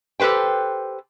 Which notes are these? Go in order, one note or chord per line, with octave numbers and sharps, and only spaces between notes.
G4 A4 B4 C5 G5